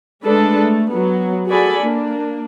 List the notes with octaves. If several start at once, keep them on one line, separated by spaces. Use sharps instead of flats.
G#3 A3 D4 A4 B4
A3
F#3 B3
F#4 G#4 A4 D5 G#5 B5
A#3 D4